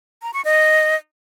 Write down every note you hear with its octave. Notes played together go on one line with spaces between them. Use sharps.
A#5
C#6
D#5